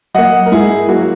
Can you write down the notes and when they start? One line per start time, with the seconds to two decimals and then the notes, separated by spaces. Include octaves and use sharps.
0.14 F#3 A#3 D#5 F#5
0.46 A#4
0.52 G#2 E4 G#4
0.89 F#3 A#3 F#4